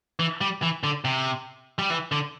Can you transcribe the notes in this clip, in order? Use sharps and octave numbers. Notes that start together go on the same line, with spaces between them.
E3
G3
E3
D3
C3
G3
E3
D3